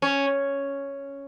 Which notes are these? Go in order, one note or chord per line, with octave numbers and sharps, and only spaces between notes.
C#4